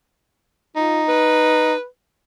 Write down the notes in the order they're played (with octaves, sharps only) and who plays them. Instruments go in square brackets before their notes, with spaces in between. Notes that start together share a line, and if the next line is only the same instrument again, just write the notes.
[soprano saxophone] D#4 [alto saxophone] F4
[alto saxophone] B4